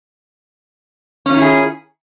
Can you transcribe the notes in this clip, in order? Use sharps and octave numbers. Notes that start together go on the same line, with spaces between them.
D#3 C#4 E4 F4 G#4